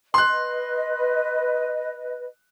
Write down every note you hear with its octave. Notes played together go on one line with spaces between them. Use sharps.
B4 D#5 C6 F#6